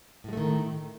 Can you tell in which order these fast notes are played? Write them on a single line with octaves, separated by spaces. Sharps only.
A2 G#3 A3 D#3